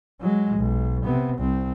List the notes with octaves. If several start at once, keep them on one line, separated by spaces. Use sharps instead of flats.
F#3 G#3
B1
C3 B3
C2 C4